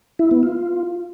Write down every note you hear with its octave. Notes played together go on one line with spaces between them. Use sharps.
E4
B3
F4